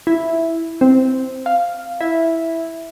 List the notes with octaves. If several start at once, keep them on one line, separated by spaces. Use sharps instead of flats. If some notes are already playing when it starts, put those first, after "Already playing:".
E4
C4
F5
E4